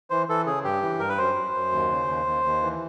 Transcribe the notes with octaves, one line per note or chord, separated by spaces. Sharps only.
E3 C5
E3 A4
C#3 G#4
G2 G4
E3
G2 A#4
B4
F#2 C5
F#2
F#2
D#2
C#3
D#2
D#2
D#2
E3